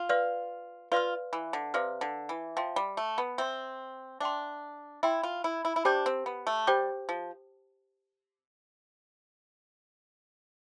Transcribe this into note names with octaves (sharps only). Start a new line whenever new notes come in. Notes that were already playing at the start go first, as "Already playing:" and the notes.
Already playing: F4
B4 D5 F5 C6 F6
F4 B4 D5 F5 C6 F6
E3
D3
C3 B4 D5 F5 C6 F6
D3
E3
F3 E5 G5 C6
G3
A3
B3
C4 E5 G5 C6
D4 E5 G5 C6
E4 E5 G5 C6
F4
E4
E4
E4
D4 G4 C5 G5 D6 G6
C4
B3
A3
G3 G4 C5 G5 D6 G6
F3